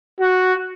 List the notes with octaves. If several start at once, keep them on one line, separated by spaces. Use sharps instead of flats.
F#4